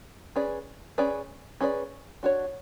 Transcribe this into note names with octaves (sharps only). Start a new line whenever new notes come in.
C#4 G#4 B4 D5
C#4 G#4 B4 D5
C#4 G#4 B4 D5
D4 F#4 C#5